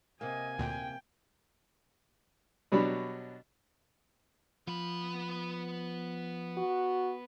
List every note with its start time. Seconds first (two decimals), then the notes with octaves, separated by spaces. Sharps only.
0.21 C3 A#3 D#5 G#5
0.58 D2 A#2 G5
2.72 B2 F#3 G3 D4 B5
4.67 F3 B3 B5
6.57 F#4